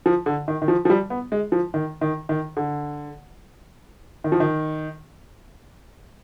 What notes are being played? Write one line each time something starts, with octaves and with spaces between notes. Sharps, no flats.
F3
D3
D#3
D#3
F3
F3
G3
B3
G#3
F3
D#3
D#3
D#3
D3
D#3
F3
D#3